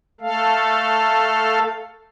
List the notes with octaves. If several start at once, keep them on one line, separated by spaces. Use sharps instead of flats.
A3 A4 F5